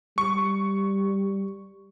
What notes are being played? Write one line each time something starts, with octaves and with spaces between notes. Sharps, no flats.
G3 C#6